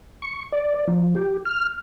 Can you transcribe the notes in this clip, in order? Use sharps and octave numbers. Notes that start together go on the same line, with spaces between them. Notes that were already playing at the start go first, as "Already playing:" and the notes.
C#6
D5
D5
F3
G4
F6